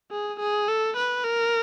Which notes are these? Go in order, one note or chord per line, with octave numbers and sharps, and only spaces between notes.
G#4
G#4
A4
B4
A#4